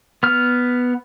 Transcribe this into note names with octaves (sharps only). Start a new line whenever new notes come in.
B3 F6